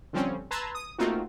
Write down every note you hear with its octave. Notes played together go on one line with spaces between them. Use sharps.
D3 F3 G3 C4 C#4
B4 A5 A#5 C6 E6 G#6
D#6
A3 A#3 C4 D#4 F4 F#4